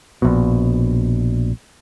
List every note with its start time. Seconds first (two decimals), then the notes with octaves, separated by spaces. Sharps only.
0.22 A#1 B2